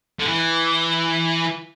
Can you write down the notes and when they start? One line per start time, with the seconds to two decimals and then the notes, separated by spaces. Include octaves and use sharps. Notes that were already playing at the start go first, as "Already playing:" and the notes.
0.20 D3
0.27 E3